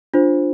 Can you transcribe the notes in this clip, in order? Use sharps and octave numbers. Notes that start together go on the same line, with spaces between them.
D4 F4 C5